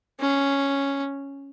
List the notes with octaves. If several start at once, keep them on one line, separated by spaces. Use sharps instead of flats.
C#4